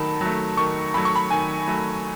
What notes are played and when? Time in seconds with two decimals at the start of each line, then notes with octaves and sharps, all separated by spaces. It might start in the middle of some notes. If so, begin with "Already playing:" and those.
Already playing: D#3 F#3 A3 A5 B5
0.21 F#3 A3
0.57 D#3 C#6
0.94 F#3 A3 B5
1.05 C#6
1.16 B5
1.30 D#3 G#5
1.67 F#3 A3